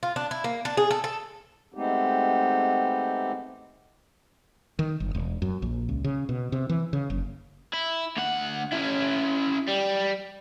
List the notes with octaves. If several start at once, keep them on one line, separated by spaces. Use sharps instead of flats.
F4
D4
E4
A#3
D4
G#4
A4
A4
G#3 A3 B3 C4 D#4 G4
D#3
G1
E1
F#2
A#1
C#2
C#3
B2
C3
E3
C#3
F#1
E4
D2 F#5
C#4 E4
G3